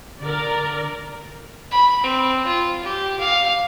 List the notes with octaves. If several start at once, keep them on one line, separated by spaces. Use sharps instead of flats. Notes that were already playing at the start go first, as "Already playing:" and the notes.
D3 A#4 D5
B5
C4
F4
G4
F5